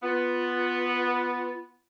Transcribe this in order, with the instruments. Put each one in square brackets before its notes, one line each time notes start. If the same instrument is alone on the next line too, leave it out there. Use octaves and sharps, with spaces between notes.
[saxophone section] B3 [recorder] F4